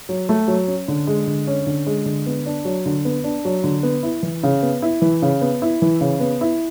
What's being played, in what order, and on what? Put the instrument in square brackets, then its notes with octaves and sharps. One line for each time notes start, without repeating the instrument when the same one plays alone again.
[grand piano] F#3
A3
F#3
C#4
D3
G#3
D3
C#4
D3
G#3
D3
B3
D4
F#3
D3
B3
D4
F#3
D3
B3
E4
E3
C#3
B3
E4
E3
C#3
B3
E4
E3
C#3
B3
E4